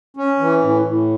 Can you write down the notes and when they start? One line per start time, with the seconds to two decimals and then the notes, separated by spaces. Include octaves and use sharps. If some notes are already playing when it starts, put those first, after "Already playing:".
0.17 C#4
0.40 E3
0.62 A2
0.86 A2